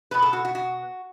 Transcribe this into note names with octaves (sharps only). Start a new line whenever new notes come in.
B2 B3 B4
A4
F#4
F#4
F#4